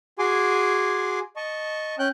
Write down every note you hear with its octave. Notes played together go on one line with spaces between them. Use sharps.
F#4 G#4 G#5 C6 D6
D#5 A5 C#6
C#4 G5 F#6 G6